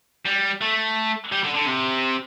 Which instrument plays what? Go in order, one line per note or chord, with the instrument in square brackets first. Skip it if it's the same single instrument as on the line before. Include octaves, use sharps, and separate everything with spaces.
[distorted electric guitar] G3
A3
G3
D3
D3
C3